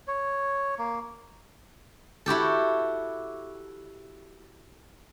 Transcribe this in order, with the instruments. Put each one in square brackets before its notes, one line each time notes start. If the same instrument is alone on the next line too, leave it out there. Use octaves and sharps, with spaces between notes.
[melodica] C#5
A#3
[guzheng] E4 F#4 G4 A4